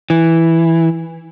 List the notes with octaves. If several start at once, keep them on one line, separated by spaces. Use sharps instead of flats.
E3